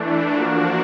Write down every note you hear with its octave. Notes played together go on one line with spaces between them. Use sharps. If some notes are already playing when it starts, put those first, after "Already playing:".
Already playing: E3 A3 D4
F3 A#3 D4 F#4